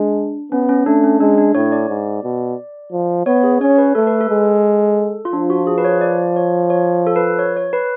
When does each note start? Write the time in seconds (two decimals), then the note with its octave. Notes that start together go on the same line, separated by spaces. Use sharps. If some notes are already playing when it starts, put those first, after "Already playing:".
Already playing: G#3 D4
0.52 B3 C#4
0.69 C#4
0.86 A3 D4
1.04 C#4
1.21 G#3 D4
1.38 D4
1.55 A2 C#5
1.72 D5
1.89 G#2
2.24 B2
2.92 F3
3.26 B3 C#5
3.43 G#4
3.61 C#4 C#5
3.78 B4
3.95 A3 A4
4.07 B4
4.21 A4
4.29 G#3
5.25 F4
5.33 F3 D4
5.50 F#4
5.67 G#4
5.78 B4
5.85 C#5
6.01 D5
6.36 C#5
6.70 C#5
7.07 A4
7.16 B4
7.39 C#5
7.57 C#5
7.73 B4